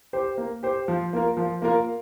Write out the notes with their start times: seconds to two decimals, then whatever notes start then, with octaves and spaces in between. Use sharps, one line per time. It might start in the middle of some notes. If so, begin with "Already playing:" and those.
0.13 G4 C5
0.37 A#3
0.63 G4 C5
0.88 F3
1.13 A#3 F4 A#4
1.37 F3
1.62 A#3 F4 A#4